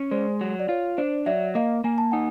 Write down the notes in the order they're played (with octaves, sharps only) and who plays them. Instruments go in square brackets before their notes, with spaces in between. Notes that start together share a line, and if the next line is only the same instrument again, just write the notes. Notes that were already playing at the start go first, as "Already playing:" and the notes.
Already playing: [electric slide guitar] C#4
[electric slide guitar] G#3 [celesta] C5 D5
[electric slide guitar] F#3
[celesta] D5
[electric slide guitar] F4 [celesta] C#5
[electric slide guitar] D4 [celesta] C5 D5
[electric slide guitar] F#3 [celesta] D5 E5
[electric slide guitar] A#3 [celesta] D#5 F5
[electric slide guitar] A#3 [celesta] G#5
[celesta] A5
[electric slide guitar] D#4 [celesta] F#5 G#5